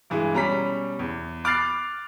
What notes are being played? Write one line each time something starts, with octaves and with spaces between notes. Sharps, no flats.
G2 E3 G#3
B2 G3 C#4 A#5 B5 B6
E2
B5 D6 F6 F#6 A6 C7